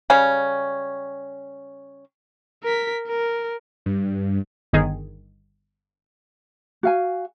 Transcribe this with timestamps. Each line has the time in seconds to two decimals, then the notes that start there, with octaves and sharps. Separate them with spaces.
0.10 C#3 G3 C#4
2.64 A#4 B6
3.08 A#4
3.86 G2
4.73 G1 D#3 G#4
6.83 F#4 F5 G#5